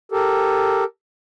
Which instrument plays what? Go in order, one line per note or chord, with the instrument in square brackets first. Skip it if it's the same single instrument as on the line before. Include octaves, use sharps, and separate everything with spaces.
[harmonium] G4 A4 A#4